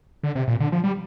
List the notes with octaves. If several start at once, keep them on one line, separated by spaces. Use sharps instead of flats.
D3
C3
A#2
D3
F3
G3